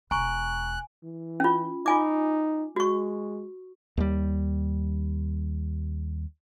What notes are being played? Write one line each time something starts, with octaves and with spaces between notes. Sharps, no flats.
E1 G#5 A#5 C#6 F#6
E3
C#4 F4
D#4 F4 G#5 D6
G#3 F#4 C#6
D#2 G3